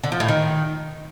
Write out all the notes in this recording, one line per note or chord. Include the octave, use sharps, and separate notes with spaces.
D3
F3
A2
D#3